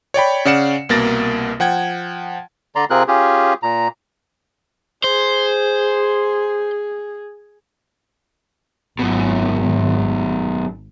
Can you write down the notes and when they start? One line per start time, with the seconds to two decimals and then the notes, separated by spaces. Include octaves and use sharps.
0.14 C#5 D5 G5 B5
0.45 C#3 C#4 D5 F#5 C#7 E7
0.89 C2 B2 A#3 A6 A#6
1.60 F3 F#5 G5 G#6
2.75 D3 D5 A#5 C6
2.90 C3 C4 F4 G#4 A#4 F#6
3.08 C#4 F4 G4 G#4
3.63 A#2 A#5
5.04 G#4 C5
8.99 G#1 F#2 B2